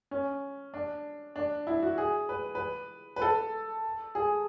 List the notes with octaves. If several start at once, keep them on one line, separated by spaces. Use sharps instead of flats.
C#4
D4
D4
E4
F#4
G#4
B4
B4
B4
A4
G#4